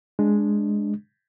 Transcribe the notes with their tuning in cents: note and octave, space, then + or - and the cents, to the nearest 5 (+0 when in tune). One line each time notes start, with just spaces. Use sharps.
G#3 +0 D4 -5